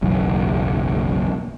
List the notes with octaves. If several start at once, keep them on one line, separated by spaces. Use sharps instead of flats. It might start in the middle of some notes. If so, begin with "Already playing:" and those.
F#1 B1 E2